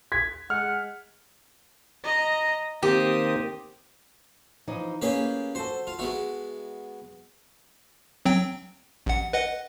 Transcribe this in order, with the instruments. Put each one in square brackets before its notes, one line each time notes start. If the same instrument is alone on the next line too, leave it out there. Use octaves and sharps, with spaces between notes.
[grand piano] G#6 B6
[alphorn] G#3 [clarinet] F#5 [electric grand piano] F6
[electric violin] D#5 A#5
[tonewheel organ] D#3 A#3 C5 [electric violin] C4 D#6 [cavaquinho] G4
[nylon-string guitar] E3 F3 D#4
[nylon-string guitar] A#3 C#4 [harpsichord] G4 G#4 B4
[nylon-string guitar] F#4 A4 [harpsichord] C5
[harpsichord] F4
[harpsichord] G#3 B3 F#4 [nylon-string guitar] E5
[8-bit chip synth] F#3 C4 G5
A1 F#5
B4 D#5 F#5